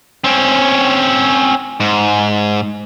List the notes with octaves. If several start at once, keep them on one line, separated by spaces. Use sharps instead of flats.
C4 C#4
G#2